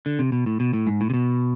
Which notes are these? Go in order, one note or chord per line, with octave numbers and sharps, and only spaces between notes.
D3
C3
B2
A2
B2
A2
G#2
A2
C3
B2